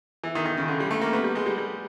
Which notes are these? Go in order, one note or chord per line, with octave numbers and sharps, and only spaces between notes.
E3
D#3
D#3
C#3
D3
G3
A3
A#3
B3
G3
G#3
G3
G3